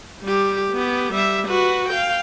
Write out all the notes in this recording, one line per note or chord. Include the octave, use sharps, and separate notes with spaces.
G3 G4
B3 G4
G3 E5
F#4 B4
F5 G5